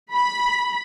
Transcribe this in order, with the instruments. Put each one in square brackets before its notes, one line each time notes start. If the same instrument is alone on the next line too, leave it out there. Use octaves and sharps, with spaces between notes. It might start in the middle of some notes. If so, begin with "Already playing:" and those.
[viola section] B5